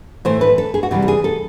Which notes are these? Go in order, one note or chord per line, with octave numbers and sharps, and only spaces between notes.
A2 E3 A3 C5
B4
A4
G#4
F#4
C3 E3 G3 G4
A4
G#4
A4